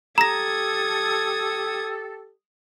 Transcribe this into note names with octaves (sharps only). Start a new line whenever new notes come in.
G4 A4 A#5 D#6 G#6 A#6